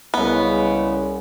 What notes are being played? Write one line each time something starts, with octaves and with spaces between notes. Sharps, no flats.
C2 C#3 G#3 B3 C#4